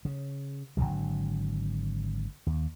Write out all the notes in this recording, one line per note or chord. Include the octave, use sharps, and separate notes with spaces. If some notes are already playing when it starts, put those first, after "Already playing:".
C#3
G#1 D#2 D3 F#3
D#2